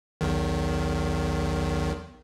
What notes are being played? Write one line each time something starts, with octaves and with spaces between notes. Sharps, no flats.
B1 E2 D#3